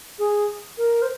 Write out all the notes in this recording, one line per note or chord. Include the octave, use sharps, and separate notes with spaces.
G#4
A#4
C5